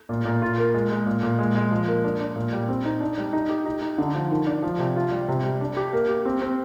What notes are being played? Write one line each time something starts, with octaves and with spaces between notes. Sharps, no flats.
A#2
A#2
F4
A#3
G#3
G#3
A#2
A#2
G#3
G#3
F3
A#3
D4
D4
A#2
G3
C4
D#4
D4
G3
D#4
G4
D#4
D#4
D3
F3
D#3
D4
F3
C3
F4
G3
C3
G3
D4
G4
A#3
G4
C4
C4